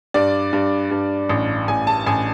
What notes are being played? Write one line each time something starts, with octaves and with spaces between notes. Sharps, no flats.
G2 D5
G2
G2
A1
A1 G#5
A5
A1 G#5